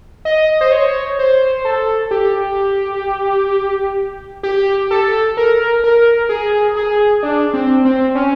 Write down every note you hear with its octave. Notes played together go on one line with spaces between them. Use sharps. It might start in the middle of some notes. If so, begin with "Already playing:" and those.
D#5
C5
C#5
C5
A4
G4
G4
A4
A#4
A#4
G#4
G#4
D4
C4
C4
C#4